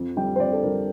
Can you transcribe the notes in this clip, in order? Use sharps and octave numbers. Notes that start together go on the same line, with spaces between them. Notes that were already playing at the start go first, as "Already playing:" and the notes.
Already playing: F2
D3 G3 G5
C5
F2 D5
A4
D3 G3 A#4